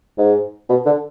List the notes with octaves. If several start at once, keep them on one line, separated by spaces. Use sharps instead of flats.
G#2
B2
D3